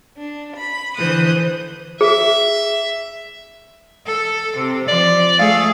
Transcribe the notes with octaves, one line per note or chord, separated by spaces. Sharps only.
D4
B5
D3 E3 C5 D#6 F#6
G#4 E5
A4
C3
F3 D5
A3 G#4 F5